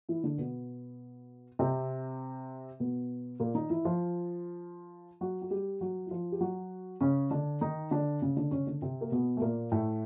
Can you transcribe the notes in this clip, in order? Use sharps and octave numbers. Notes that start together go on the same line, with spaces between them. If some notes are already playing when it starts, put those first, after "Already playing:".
E3 E4
D3 D4
B2 B3
C3 C4
B2 B3
A#2 A#3
D#3 D#4
E3 E4
F3 F4
F#3 F#4
F#4
G3 G4
F#3 F#4
E4
F3 F4
G4
F#3 F#4
C#3 C#4
D3 D4
D#3 D#4
D3 D4
C#3 C#4
D3 D4
C#3 C#4
D3 D4
C3 C4
A#3
B2 B3
A3
A#2 A#3
A2 A3